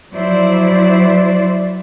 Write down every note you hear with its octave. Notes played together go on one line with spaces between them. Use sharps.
F3 F#3 E4 C5 D5